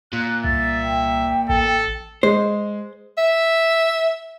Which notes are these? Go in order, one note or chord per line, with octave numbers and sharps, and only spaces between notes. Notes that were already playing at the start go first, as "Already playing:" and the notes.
A#2 F#6
C2 E5 A6
G5
A1 A4
G#3 C5
E5